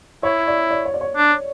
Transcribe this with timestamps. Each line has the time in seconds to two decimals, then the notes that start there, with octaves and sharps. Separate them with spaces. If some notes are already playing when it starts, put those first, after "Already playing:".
0.23 E4 C#5
0.48 D5
0.70 D5
0.85 C#5
0.94 D5
1.01 C#5
1.17 D4